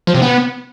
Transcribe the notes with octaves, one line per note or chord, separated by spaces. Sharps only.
F3
C3
B3